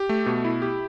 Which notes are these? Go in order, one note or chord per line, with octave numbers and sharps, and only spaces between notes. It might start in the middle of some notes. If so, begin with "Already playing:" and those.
Already playing: G4
A3
B2
E4
G4